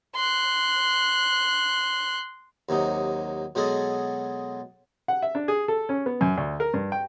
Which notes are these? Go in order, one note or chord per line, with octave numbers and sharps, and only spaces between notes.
C6 F#6
D#2 C3 F#3 D#4
B2 F#3 G#3 F#4 G#4 A4
F#5
E5
D4
G#4
A4
C#4
B3
F#2
D2
A#4
G2
G5